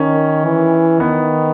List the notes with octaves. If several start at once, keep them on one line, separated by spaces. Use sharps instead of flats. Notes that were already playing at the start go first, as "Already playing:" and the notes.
Already playing: D#3 C#4
E3
D#3 B3